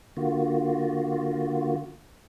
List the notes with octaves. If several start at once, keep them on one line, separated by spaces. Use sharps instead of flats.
D3 A#3 F4 F#4